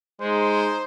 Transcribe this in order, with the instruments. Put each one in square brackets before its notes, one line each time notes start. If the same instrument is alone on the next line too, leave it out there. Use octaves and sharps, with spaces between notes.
[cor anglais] G#3 [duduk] D#4 [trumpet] C5